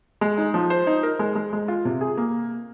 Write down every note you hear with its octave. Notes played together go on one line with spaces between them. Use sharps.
G#3
D#4
F3
C5
D#4
A#4
G#3
G#3
G#3
F4
C3
G#4
A#3